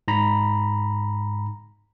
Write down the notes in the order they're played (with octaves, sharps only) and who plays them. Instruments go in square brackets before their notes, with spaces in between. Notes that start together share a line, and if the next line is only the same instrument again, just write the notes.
[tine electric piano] G#2 A#5 B5